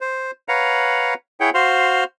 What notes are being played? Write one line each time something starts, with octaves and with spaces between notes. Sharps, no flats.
C5
B4 C#5 F5 F#5 A#5
E4 G#4 C#5 F#5 G5
F#4 C5 F5 C6